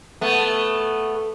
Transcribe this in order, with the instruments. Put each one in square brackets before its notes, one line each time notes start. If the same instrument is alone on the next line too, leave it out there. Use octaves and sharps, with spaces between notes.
[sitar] A3 B3